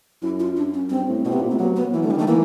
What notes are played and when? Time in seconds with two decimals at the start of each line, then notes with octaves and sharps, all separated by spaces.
0.22 F#2 E4
0.40 F4
0.56 D4
0.74 C#4
0.90 G2 C4
1.08 A2
1.25 B2 C4
1.33 C3 B3
1.42 A#2
1.51 C3 A3
1.59 F#3 A#3
1.76 B3
1.93 E3 A#3
2.03 D3 A3
2.11 G3
2.17 D#3 A3
2.28 E3 A#3